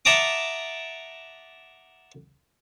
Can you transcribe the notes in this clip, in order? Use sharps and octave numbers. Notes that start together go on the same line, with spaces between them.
E5 F#5 A5 A#5 D6 D#6